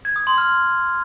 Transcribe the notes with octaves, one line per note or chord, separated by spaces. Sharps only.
G#6
D#6
C6
F6